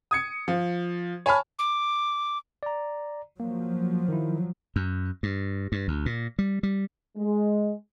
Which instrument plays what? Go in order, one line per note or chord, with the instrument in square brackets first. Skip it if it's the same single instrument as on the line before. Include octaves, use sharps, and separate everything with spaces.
[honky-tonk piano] D#6 G#6 C#7
F3
C#5 G#5 A5 B5 F6
[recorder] D6
[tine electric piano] D5 A#5
[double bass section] F3 F#3 [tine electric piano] A#3
[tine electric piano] D#3 E4
[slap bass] F#2
G2
G2
D2
A#2
G3
G3
[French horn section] G#3